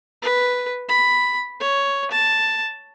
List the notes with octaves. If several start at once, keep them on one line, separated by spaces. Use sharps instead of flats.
B4
B5
C#5
A5